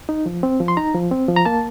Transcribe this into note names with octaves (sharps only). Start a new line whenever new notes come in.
D#4
F3
C4
F3
C6
D#4 A#5
F3
C4
F3
A#5
A#3 A5